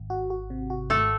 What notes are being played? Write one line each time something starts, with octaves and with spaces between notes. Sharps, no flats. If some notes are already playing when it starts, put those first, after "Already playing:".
Already playing: G#1
F#4
F#4
C3
F#4
G#1 A3 A4